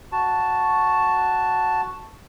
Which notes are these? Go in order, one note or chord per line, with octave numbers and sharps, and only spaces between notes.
F#4 A5